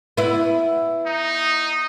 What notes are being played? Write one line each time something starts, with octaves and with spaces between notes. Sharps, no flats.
B3 E4
D#4